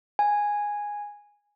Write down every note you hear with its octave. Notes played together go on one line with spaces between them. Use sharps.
G#5